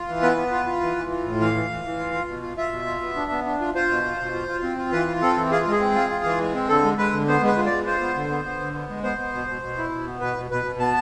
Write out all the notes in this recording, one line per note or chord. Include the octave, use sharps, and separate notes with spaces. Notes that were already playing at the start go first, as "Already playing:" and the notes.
Already playing: F4
E3
B3 B4
B3
F4
F4
E3
E3
F4
A2
E3 F5
E3
E3
E3
F4
F4
B2
F4
F4 E5
B2
F4
B3
D4
B3
D4
F4
F4 C5
B2
F4
B2
F4
F4
C4
F4
E3 B4
F4
C4 A4
E3
F4 G#4
G#3 F4
G#4
C4
F4
F4
E3
G#3
C4
D3 A4
G#3
G#3 B4
D3
B3 C5
G#3 B4
F4
D5
G#3
F4 C5
B3
D3
B3
B3
D3
B3
G#3
B3 C5
B3
B2
B2
B2
E4
B2
B3
B2 B4
B2
B2 B4
B2
B3 A5